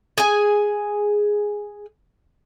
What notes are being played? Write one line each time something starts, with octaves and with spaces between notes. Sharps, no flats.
G#4 G#5